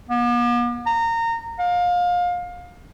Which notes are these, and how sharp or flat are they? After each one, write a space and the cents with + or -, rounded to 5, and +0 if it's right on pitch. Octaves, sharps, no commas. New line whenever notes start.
B3 -45
A#5 -20
F5 +25